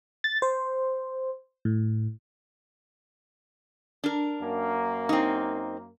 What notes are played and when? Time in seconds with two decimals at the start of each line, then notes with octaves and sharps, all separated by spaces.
0.24 A6
0.42 C5
1.65 A2
4.04 D4 A#4
4.40 F#2 A#3
5.09 C4 D#4